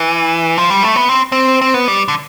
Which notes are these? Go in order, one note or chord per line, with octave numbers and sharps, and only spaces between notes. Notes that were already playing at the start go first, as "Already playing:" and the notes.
Already playing: E3
F3
G3
A3
B3
C4
C4
C4
B3
G3
D3